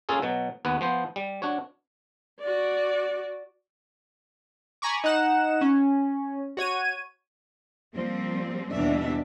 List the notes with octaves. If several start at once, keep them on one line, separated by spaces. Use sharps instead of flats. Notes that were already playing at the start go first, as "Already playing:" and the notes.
A#3 C#4 F4 G#4 A4
B2 F#3
D#2 B3 B4
F3 B3 C5
G3
D4 F#4 C#5
F#4 D5
G#5 A#5 B5 C#6 D6
D#4 F#5 E7
C#4
F#4 C#5 G#6 D#7
F3 G3 A#3 C4
D#2 B2 E3 G3 D4 E5